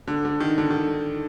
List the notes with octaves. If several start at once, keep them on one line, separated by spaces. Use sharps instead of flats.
D3
D3
D#3
D3
D#3